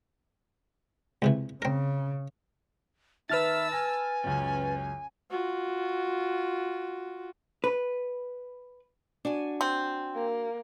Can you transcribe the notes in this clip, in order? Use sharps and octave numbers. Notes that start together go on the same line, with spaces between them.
C#2 C3 E3
C#3 C4 A#4
D#3 B4 E5 A5 E6 F6 A6
G#5 A#6
C#2 F#2 C#4
F4 F#4
B4
D4 F#4 G#5
C4
A#3